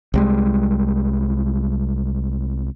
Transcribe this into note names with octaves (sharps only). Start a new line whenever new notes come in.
C2 G3 G#3